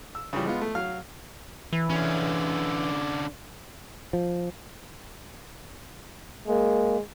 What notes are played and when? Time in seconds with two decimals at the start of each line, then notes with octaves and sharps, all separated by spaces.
0.15 E6
0.33 C#3 E3 F3 G3
0.46 G#3 B3 F4
0.61 A3
0.75 F#3 F5 F6
1.73 E3
1.90 D3 C#4
4.13 F3
6.47 G#3 A#3